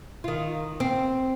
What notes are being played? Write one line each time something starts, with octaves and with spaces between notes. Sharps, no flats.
D#3 F4
C4